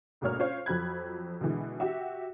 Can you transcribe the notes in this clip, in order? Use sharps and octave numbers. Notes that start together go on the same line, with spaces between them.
D2 G#2 B2 A#3 C#5 F6
C#4 F4 C5 C#5 F5
F2 F3 F#3 B5 F#6 G#6
B2 D3 E3 G#3
F#4 G4 E5